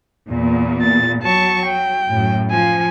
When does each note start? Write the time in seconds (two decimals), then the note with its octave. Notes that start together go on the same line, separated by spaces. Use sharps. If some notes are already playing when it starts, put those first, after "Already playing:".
0.29 E2 A#2
0.82 A6
1.23 F#3 A5 C#6
1.66 G5
2.10 F#2 A2
2.51 F3 G#5